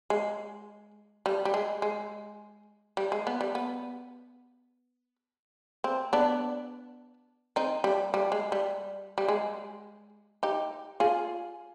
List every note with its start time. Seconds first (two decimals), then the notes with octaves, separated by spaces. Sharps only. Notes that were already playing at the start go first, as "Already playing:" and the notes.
0.10 G#3
1.26 G3
1.45 G3
1.54 G#3
1.82 G#3
2.97 G3
3.12 G#3
3.27 B3
3.41 G3
3.55 B3
5.84 C4
6.13 B3 D4
7.56 C4 D#4
7.84 G3
8.14 G3
8.32 G#3
8.52 G3
9.18 G3
9.28 G#3
10.43 D#4 G4
11.00 F4 G#4